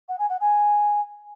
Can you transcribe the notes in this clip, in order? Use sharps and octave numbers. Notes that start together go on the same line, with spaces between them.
F#5
G#5
F#5
G#5